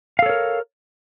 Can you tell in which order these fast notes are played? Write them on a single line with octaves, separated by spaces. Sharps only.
F5 A4 C#5 A#4